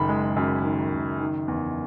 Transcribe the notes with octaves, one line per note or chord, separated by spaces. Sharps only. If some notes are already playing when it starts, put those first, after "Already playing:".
Already playing: F#1 D#3 B5
G#3
F#2
D#3
F#1
D#3
E2